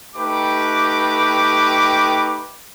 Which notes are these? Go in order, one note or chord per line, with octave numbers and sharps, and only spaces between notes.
A3 D#4 G4 B4 G5 D6